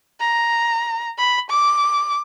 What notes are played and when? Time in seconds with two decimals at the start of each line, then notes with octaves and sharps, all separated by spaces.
0.20 A#5
1.18 B5
1.50 D6